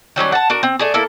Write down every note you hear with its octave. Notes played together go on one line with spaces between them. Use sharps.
D#3 F#3 G3 C#4
F#5 A5
D4 F#4 A#4
C4
A3 D4 G#4
A#3 E4 A4